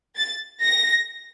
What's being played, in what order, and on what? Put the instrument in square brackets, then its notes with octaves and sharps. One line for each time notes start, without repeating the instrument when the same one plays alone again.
[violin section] A6
A#6